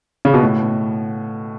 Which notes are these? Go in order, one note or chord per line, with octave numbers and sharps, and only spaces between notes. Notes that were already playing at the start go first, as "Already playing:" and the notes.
C#3
B2
A2